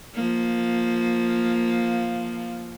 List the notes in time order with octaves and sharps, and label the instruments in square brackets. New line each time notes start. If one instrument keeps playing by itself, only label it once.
[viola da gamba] F3 A#3